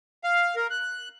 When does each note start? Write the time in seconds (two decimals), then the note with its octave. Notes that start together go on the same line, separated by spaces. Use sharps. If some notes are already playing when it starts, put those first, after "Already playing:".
0.24 F5
0.56 A#4
0.70 F#6